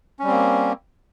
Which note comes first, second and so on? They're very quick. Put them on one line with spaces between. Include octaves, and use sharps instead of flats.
C#4 G3 C4 A#3